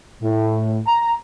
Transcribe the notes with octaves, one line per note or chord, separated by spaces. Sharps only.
A2
A#5